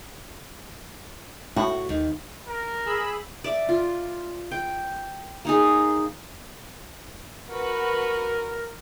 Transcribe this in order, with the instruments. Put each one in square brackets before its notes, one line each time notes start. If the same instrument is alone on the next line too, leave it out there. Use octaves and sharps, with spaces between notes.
[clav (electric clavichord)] A2 [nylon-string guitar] F#4
[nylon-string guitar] D#2
[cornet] A#4
[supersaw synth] G#4 B5 E6
[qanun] D5 E5
F4
G5
A#3 D#4 G#4
[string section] F#4 B4 [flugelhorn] A#4